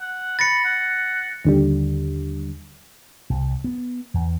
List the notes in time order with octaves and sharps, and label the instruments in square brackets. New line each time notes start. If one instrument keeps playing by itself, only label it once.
[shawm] F#5
[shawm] B5 [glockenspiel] A6 A#6 C#7
[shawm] F#5
[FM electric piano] D#2 D3 G3
[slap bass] C2
B3
E2